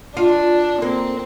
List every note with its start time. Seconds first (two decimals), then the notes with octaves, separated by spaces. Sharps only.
0.17 D4 F4
0.82 A#3 C4